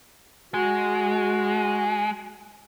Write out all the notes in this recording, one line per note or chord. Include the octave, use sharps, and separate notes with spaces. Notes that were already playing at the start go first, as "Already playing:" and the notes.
G#3 F#4